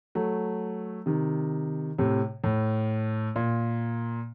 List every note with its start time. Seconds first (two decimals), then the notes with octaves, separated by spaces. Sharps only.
0.15 F#3 A3
1.06 C3 D#3
1.98 A2 C3
2.44 A2
3.36 A#2